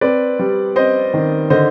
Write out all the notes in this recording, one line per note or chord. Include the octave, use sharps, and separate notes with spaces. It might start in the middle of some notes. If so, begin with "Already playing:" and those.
C4 B4 D5
G3
C4 C5 D#5
D#3
D3 C5 D#5